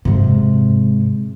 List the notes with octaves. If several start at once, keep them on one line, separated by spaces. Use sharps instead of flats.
G#2 C3